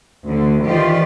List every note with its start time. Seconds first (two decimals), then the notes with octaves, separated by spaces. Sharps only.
0.25 D2 D3
0.64 D#3 E3 F4 G4 C5 D5